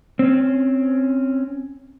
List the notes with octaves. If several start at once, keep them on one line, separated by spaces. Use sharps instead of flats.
C4 C#4